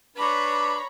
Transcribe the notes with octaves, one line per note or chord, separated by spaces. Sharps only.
D4 B4 C#5 A#5 B5